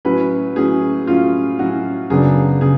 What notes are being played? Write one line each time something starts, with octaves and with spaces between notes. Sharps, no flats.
A2 F#3 C#4 B4
A2 F#3 C#4 G#4
A2 F#3 C#4 F4
A2 F#3 C#4 F#4
F#2 C#3 F#3 B3 D4 G#4
C#3 G#4